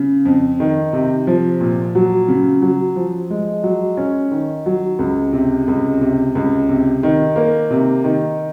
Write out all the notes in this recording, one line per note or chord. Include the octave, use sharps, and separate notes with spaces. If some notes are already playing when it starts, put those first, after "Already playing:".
Already playing: C#3
F2
D#3
C3
F3
A#2
F#3
C#3
F#3
F3
G#3
F#3
C#4
D#3
F#3
C#2
C3
C#2
C3
C#2
C3
D#3
A#3
C3
D#3